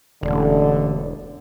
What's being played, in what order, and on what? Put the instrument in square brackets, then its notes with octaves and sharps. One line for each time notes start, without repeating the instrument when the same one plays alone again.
[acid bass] E1 [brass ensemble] A1 D3